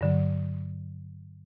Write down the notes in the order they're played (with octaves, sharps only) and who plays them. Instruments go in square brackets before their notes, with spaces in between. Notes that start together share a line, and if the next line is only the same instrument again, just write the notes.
[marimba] G2 D3 F#3